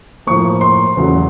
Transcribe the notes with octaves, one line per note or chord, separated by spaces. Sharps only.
A2 F3 A#3 C#6
C6
E2 C#3 F#3 A3